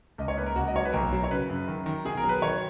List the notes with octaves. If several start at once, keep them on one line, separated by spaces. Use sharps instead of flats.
C#2 D#5
C#5
A#3 B4
A#4
C#2 F#4
D#5
F#3 C#5
B4
B1 A#4
F#3
C#5
C#3 B4
F#2
D#3
D#3
B2 G#4
A#4
F#3
B4
D#3 C#5